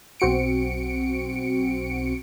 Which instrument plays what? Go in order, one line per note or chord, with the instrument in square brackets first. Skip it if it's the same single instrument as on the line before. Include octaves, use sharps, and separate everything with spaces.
[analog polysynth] B1 C4 F#4 C#7 D7